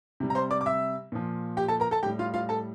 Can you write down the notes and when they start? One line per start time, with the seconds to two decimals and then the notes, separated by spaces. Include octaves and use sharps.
0.20 C3 G3
0.30 A#5
0.35 C5 C6
0.51 D5 D6
0.61 D6
0.66 E5 E6
1.12 A#2 F3
1.57 G4 G5
1.68 A4 A5
1.80 A#4 A#5
1.91 A4 A5
2.03 A2 G3 G4 G5
2.19 F4 F5
2.34 F4 F5
2.49 A4 A5